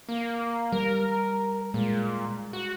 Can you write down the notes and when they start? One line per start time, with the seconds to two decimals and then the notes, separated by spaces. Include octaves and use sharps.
0.09 A#3
0.72 G3 A#4
1.74 A#2 G#3
2.53 F#4